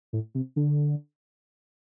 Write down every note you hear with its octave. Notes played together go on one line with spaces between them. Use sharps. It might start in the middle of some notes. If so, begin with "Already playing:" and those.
A2
C3
D3